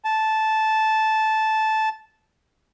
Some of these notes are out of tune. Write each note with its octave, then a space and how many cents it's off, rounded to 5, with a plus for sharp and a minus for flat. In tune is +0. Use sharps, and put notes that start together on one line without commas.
A5 -10